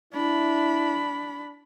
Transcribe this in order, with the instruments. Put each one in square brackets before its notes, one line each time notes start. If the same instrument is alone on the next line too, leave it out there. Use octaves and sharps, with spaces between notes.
[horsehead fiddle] D4 B5 [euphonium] E4